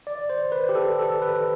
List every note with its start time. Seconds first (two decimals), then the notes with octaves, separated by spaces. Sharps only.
0.07 D5
0.30 C5
0.52 B4
0.69 G4
0.75 A4
0.99 A4
1.22 B4